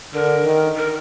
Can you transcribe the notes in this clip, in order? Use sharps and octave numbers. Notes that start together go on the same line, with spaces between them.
D3 A#4
D#3
A#4